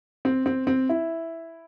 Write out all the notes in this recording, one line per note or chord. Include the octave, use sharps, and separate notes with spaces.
C4
C4
C4
E4